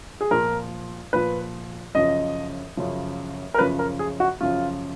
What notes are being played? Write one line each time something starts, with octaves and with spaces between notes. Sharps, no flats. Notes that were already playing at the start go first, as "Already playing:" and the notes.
G#4
A#2 F3 A#4
A#2 F3 B4
F#2 C#3 F3 D#5
F#2 C#3 F3
A#4
F#2 C#3 F3 B4
A#4
G#4
F#4
F#2 C#3 F3 F4